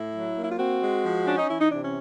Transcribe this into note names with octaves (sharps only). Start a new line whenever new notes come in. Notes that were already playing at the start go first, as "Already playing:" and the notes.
Already playing: A2 E4
F#3
A#3
E4
F4
C4 F#4
G#3
F3
C#4 D4
D#4
E3 E4
D#4
C3 D4
C#4